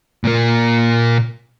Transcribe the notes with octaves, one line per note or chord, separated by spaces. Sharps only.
A#2 A#3